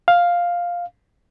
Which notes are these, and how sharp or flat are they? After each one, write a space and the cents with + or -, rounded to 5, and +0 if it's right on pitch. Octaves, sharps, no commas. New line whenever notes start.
F5 +5